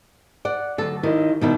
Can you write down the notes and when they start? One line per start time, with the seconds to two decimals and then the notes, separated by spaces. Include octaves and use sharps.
0.45 D5 F#5
0.78 D3 F#3 A4
1.03 D#3 E4 G4 D#5
1.41 B2 D#3 G3 D#4 E4